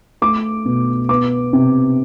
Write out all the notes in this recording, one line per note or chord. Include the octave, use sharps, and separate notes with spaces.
A3 D6
B2
B3 D6
C3